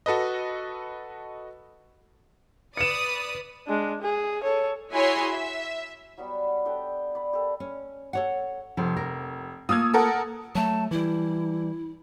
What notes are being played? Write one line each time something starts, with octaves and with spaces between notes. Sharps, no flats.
F#4 A4 B4 D#5
B4 D5 D#6 C#7 E7
G#3 D4
G#4
A4 C#5
E4 F#4 G#4 C#5 G#5 C6
E5
F#3 G3 B3
F#5
D4 G4 A4 G5
D5 B5
G4 A4 A#4
C#4
A4 C#5 F#5
F1 F3
A#4
A3 A#3 F4 D#6 E6 G#6
A4 A#4 F#5
F#3 A3 A5
E3 G3 E4